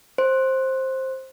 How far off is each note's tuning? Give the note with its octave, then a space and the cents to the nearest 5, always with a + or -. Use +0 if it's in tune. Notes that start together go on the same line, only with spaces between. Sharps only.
C5 +10